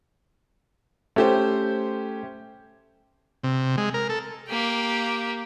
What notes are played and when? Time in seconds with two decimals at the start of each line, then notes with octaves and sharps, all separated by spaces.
1.16 A3 C#4 G4 C5
3.44 C3
3.78 G#3
3.94 A#4
4.09 A4
4.49 A#3 G4